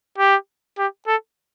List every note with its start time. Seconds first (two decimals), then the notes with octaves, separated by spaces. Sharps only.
0.18 G4
0.78 G4
1.07 A4